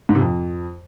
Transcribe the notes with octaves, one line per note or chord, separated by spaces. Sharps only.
G#2
C3
F2